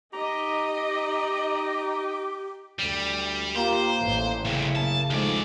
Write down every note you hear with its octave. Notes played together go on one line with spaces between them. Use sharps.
D#4 G4 D#5 A#5
D2 G3
A#3 F4 G4 A#4 C5
A1 A2 E3
C2 A#2 C#3 E4
F#2 A#3 A5
D#2 F3 G#3 A3 D#4 D5